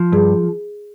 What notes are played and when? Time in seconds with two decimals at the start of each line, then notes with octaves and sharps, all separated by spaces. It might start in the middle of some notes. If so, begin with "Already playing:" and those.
Already playing: F3
0.12 G2 G#4